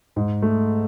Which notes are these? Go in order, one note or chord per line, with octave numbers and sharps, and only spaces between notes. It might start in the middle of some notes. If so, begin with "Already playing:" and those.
G#2
A3